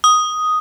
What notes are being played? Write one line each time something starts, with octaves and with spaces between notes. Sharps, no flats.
D#6